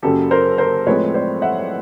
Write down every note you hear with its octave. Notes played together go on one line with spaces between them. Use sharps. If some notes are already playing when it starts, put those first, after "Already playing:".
F#1 F#2 C#3 F#3 G4 A4
A#4 C5
A#4 C5
A2 F3 G#3 C4 B4 C#5
C5 D5
E5 F#5